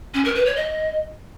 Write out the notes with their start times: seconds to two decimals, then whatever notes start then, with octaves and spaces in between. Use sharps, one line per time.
0.14 C#4
0.25 A#4
0.35 B4
0.46 C#5
0.56 D#5